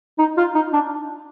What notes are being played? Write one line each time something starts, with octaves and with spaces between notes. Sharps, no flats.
D#4
F4
D#4
D4